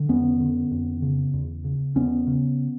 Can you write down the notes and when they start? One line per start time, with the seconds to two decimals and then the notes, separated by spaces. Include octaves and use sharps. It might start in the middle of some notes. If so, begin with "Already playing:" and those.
Already playing: D3
0.09 F2 B3 C#4
0.40 D3
0.71 F2
1.02 C#3
1.34 E2
1.64 C#3
1.96 E2 B3 C#4
2.27 C#3